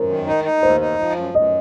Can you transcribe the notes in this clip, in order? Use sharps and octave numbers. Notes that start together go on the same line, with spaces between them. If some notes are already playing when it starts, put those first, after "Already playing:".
Already playing: F#2 A#4 C5
D#3
D#4
D#4
D#2 C5
D#4
F3
F#2
F#2 D#5